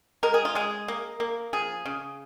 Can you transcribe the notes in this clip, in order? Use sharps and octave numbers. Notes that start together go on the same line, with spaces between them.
G#3 A#4
G#4
F4
G#3 G#4
A#3
A#3
F3 G#4
C#3